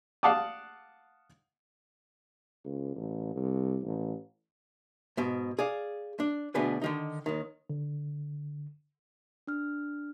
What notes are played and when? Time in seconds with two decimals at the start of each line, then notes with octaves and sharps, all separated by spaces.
0.23 F5 F#5 A5 D6 D#6
2.64 C#2
2.95 A1
3.35 C2
3.82 A1
5.17 G#2 B2
5.59 G#4 D5 F5
6.20 D4
6.55 D2 B2 D4 G#4 B4
6.82 D3 D#3 D#4
7.26 D#2 D#3
7.70 D3
9.47 D4 F6